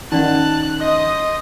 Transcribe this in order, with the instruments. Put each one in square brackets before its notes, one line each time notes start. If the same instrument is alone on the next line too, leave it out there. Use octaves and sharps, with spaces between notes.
[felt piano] D#3 [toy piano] C#4 D5 F#5 [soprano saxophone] A5 [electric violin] F#6
[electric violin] C5 D#6 [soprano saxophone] D#5 [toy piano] E5